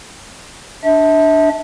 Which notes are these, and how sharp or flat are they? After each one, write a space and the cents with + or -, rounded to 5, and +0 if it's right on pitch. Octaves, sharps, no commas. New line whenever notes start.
D4 +0 E5 -35